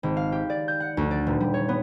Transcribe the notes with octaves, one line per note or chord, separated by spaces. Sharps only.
G#1
F5
G4
D5
G6
F#5
D2
D5
D#1
G3
C#5
B3